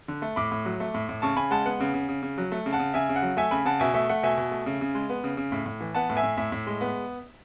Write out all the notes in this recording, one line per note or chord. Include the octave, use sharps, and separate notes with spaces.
D3
A3
A2 B5 D6
A2
F#3
A3
A2
A2
C#3 A5 C#6
C#3 G#5 B5
G#3 F#5 A5
B3 F#5
C#3
C#3
C#3
C#3
F#3
A3
C#3
F#5 A5
C#3
C#3 E5 G#5
C#3
F#5
F#3
A3 E5 G#5
C#3 G#5 B5
C#3 F#5 A5
B2 E5 G#5
A3 E5
A3 F#5
B2 E5 G#5
B2
A3
C#3
C#3
G#3
B3
C#3
C#3
A2
A2
E3
B3 F#5 A5
A2
E5 G#5
A2
A2 E5
A2
G#3
B3